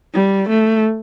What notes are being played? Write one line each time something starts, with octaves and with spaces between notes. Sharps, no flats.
G3
A3